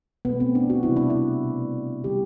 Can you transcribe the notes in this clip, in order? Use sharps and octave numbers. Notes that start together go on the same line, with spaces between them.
B2 A3 B3
C4
D4
F#4
C3 G3 E4
D4
E4
B2 A3
D3 G3 G4